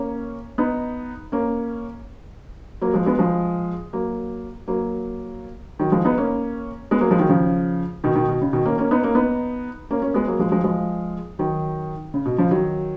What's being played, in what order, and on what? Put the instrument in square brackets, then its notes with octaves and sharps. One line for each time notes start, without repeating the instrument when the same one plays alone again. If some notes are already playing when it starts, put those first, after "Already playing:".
Already playing: [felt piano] A#3 C#4
B3 D#4
A#3 C#4
F#3 A#3
F3 G#3
G#3 B3
F3 G#3
F#3 A#3
F#3 A#3
D#3 F#3
F3 G#3
B3 D#4
A#3 C#4
G#3 B3
F#3 A#3
F3 G#3
D#3 F#3
C#3 F3
B2 D#3
B2 D#3
B2
C#3
B2 D#3
A#3 C#4
A#3 C#4
B3 D#4
A#3 C#4
B3 D#4
A#3 C#4
A#3 C#4
G#3 B3
F#3 A#3
F3 G#3
F3 G#3
F3 G#3
D#3 F#3
C#3
B2
C#3 F3
D#3 F#3